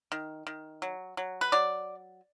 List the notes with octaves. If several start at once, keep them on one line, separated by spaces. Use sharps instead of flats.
D#3
D#3
F#3
F#3
B4
F#3 D5